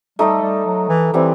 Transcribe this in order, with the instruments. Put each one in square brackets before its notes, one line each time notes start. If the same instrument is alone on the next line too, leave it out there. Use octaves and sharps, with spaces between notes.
[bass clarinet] G3 [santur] A3 D#4 A4 D#5
[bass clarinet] G3
F#3
E3
[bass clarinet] E3 [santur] G3 C4 E4